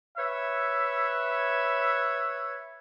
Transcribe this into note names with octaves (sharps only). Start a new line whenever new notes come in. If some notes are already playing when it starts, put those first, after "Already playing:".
B4 C#5 E5